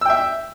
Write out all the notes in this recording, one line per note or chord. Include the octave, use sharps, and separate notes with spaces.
E5 G5 E6